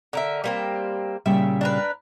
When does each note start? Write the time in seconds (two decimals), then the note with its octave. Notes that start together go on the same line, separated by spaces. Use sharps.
0.13 D3 A#4 E5
0.44 G3 A#3 C4
1.26 A#2 C#3 G3 E5
1.61 D4 A#4 B4